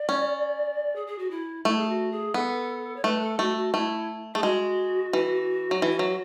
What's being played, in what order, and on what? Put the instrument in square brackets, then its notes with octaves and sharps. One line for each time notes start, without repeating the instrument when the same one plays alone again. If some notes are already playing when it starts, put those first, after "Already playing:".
Already playing: [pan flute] D5
[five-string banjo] C#4
[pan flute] G#4
G#4
F#4
E4
[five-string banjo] A3 [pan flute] E4
[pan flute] G#4
F#4
G#4
[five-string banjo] B3 [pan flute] A4
[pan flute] C#5
[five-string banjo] A3 [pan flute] B4
[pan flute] A4
[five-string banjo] A3 [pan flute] F#4
[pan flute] F#4
[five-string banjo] A3 [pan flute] E4
[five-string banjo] A3 [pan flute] G#4
[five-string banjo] G#3 [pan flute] F#4
[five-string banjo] E3
F#3
E3
F#3